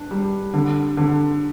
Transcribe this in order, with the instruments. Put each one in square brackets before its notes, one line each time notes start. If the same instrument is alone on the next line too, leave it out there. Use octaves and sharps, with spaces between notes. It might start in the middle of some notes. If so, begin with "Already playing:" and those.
Already playing: [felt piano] D4
G3
D3
D3